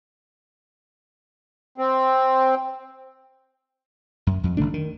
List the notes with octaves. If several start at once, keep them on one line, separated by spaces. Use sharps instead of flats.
C4
F#2
F2
G#1 D3 A3 D4
D#3